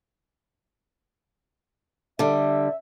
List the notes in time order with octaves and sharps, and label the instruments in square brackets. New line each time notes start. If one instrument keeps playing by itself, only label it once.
[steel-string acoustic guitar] D3 G3 [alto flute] E5